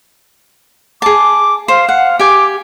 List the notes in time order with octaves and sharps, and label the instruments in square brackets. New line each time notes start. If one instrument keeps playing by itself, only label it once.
[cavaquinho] G#4 A5 [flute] D6
[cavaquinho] C5 [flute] F5
[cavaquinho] F#5
[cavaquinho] G4 G#5 [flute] D6